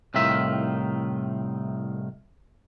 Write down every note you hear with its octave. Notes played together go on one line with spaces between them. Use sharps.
C2 A2 D#3 F4 E5